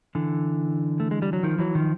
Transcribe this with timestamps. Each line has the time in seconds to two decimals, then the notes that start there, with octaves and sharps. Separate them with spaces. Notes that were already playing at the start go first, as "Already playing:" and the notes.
0.15 D3 E3
1.00 A3
1.11 G#3
1.22 G3
1.33 F#3
1.43 D#3 F3
1.59 E3 F#3
1.75 D#3 F3